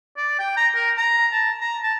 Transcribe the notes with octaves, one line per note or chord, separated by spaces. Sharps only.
D5
G5
A#5
A#4
A#5
A5
A#5
A5